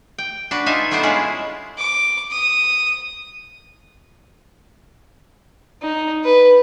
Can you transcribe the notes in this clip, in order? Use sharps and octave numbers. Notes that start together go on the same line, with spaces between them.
G5
D4 F#4 B4
D#4 F4 E5 G#5 A5
G3 A3 B3 D4 C5
G#3 C#4 E4 F4 G#4 B4
D6
D#6
D#4
B4